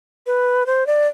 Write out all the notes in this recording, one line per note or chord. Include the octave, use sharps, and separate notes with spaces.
B4
C5
D5